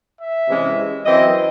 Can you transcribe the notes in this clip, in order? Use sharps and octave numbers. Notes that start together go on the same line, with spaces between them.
E5
C3 E3 G#3 C#4
F#2 E3 C4 D#5